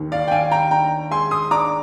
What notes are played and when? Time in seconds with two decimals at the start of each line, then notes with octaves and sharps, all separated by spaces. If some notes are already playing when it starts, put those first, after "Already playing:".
Already playing: D#2 D#3
0.12 D5 F5
0.28 G5
0.31 D#3 F5 G#5
0.52 G5 A#5
0.71 D4 G5 A#5
1.11 G#3 G#5 C6
1.31 C6 D#6
1.51 D4 A#5 D6